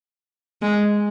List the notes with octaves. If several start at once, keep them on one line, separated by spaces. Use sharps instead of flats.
G#3